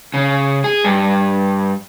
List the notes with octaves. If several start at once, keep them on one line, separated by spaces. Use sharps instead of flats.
C#3
G#4
G2